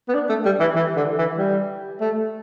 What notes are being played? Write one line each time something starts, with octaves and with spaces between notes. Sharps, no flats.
B3
D4
A3
G3
E3
E3
D3
E3
G3
A3